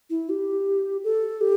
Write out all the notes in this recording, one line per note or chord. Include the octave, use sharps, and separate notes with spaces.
E4
G4
A4
G4